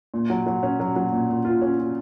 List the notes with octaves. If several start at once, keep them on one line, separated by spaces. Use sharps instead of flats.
A#2
F#3
F#3
C#4
F#3
F#3
A#2
A#2
F4
C#4
F4